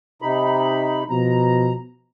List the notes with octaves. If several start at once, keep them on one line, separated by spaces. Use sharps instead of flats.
C3 D#4 B5
B2 F3 A#5